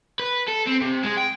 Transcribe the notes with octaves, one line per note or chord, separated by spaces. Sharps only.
B4
A4
C4
C3
G#3
G5